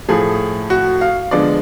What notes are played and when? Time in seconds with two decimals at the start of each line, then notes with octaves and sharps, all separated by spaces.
0.09 A2 F3 A3 G#4
0.70 F#4
1.01 F5
1.31 D3 F3 G#3 B3 D5